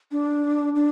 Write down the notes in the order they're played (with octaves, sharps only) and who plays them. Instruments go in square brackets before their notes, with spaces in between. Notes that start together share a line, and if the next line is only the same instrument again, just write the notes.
[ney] D4
D4